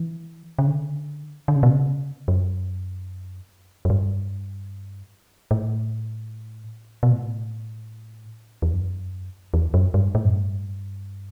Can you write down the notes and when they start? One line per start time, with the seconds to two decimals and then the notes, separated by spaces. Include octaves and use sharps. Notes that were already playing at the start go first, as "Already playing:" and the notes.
Already playing: E3
0.59 C#3
0.67 D3
1.48 D3
1.56 C#3
1.63 B2
1.70 C#3
2.28 F#2
3.85 F#2
3.90 G2
5.51 A2
7.03 B2
7.12 A2
8.62 E2
8.73 F#2
9.54 E2
9.74 F#2
9.94 G2
10.15 A2
10.25 F#2
10.34 G2